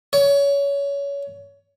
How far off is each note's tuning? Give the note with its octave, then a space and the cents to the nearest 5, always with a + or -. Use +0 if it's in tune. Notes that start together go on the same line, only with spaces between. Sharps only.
C#5 +25